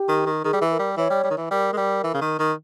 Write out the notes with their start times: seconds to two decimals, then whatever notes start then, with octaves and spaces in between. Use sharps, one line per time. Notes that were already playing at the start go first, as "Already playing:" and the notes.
Already playing: G4
0.09 D#3
0.26 D#3
0.44 D#3 G#4
0.53 G3
0.61 E3
0.71 A#4
0.79 G3
0.97 E3 C#5
1.10 G3
1.24 G3
1.30 D#3
1.37 E3
1.50 G3 A#4
1.73 G#3
1.77 G3
2.04 E3
2.14 C#3
2.21 D#3
2.39 D#3